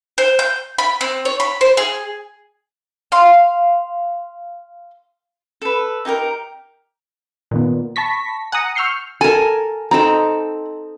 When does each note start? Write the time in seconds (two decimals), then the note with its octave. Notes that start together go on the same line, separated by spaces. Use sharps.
0.18 C5
0.39 G6
0.78 B5
1.01 C4
1.25 C#5
1.40 B5
1.61 C5
1.77 G#4
3.12 F5 C6
5.62 A4 B4
6.05 D#4 G4 G#4 A#4
7.51 A#2 D#3 B3
7.96 A5 B5 C#6 A#6 B6
8.52 F#5 G#5 A#5 D#6 A#6
8.75 C#6 E6 F6 G6 C7 C#7
9.21 A4 A#4 G#5
9.91 C4 D#4 A4 A#5